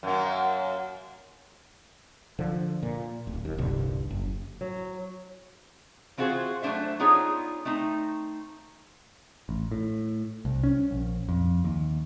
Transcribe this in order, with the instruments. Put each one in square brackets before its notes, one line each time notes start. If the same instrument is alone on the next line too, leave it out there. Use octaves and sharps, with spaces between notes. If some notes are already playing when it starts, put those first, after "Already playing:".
[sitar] F#2 A#3
[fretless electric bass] D3 F3
A#2
D1
D#2
D#1 C2 G2 D3
F#1
[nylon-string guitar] F#3
[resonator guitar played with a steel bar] E3 C4 F4 F#4 G#4 C5
F#3 A3 A#3 D4 C5 E5
B3 D4 D#4 F4 G#4 C#5
A3 C4 D#4
[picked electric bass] A1
A2
C2
C#4
A#1
F2
D#2